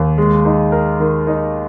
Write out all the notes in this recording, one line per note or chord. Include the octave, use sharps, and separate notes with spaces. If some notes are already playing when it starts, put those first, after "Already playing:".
Already playing: D#2
G#3
D#4
A#4
D#3
D#4